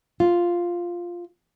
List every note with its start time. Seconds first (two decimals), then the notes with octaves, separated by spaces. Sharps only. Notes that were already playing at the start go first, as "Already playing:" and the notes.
0.20 F4